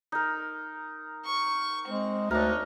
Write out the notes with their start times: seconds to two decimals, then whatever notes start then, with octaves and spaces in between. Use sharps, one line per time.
0.12 D#4 A#4
1.25 C#6
1.88 G#3 C4
2.31 D2 D4 D#4 A#4 C#5